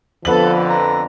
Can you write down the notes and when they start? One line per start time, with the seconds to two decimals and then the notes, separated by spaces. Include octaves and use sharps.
0.25 F2 D3 F3 B3 A4 B4 F#7
0.69 A#5